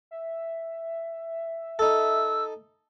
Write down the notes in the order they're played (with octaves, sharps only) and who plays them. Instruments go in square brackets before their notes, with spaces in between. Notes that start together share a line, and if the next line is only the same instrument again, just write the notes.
[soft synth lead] E5
[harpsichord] D#4 A4 [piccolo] E6